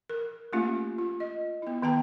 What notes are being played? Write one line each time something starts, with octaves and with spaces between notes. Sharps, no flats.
A#4
A3 A#3 C#4 F4 G4
F4
D#5
B3 E4
D#3 B3 G5 A5 A#5